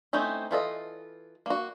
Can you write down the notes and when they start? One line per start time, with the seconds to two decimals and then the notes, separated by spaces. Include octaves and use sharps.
0.13 A3 C4 C#4 D#4 E4
0.51 E3 F4 A4 D#5
1.46 A#3 F#4